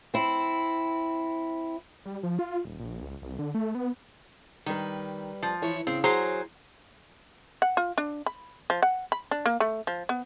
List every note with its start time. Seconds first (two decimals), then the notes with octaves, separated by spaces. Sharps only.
0.14 C4 E4
2.06 G3
2.23 F3
2.39 F4
2.65 D#1
2.80 A#1
3.02 C#2
3.22 C2
3.39 D3
3.55 A3
3.75 B3
4.66 D#3 G3 B4
5.43 F3
5.62 E3 E4 C#5
5.87 C#3 C4
6.04 F#3 G#4 C5 A#5
7.62 F#5
7.77 F4
7.98 D4
8.26 B5
8.70 F3
8.83 F#5
9.12 B5
9.31 D4
9.46 A#3
9.60 A3
9.87 F3
10.09 B3